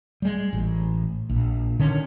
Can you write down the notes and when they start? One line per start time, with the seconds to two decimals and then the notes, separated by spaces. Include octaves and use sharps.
0.22 G3 G#3
0.53 A1
1.29 A#1
1.79 D3 D#3 C#4